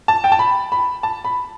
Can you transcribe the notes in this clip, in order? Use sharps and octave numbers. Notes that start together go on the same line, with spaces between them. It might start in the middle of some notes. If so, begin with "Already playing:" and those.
A5
G5
A5
B5
B5
A5
B5